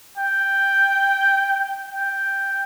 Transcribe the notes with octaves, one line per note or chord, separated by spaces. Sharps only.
G5
G5